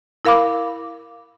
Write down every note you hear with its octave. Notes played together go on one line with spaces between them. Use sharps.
E4 A#4 F5 B5 D6